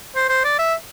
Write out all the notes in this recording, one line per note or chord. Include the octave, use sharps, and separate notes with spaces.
C5
C5
D5
E5